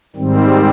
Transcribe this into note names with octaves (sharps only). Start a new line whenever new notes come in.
G#2 D#3 G3 C4